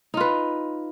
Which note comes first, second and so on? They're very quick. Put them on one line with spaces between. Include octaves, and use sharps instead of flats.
D#4 F4 B4